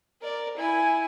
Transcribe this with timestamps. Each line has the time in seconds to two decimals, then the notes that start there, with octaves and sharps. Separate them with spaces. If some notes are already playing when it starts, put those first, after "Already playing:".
0.22 A#4 D5
0.57 E4 G#5